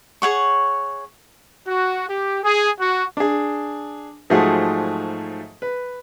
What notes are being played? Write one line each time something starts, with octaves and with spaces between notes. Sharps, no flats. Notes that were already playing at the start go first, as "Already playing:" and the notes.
G#4 C#5 F#5 C#6
F#4
G4
G#4
F#4
D4 G#4
G#2 F3 F#3 A3 G#4 F#5
B4